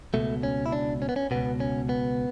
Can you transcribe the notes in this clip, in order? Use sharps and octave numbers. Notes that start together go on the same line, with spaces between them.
C#2 B2 A3
C#4
E4
D4
C#4
B3
C#4
C#2 B2 B3
C#4
B3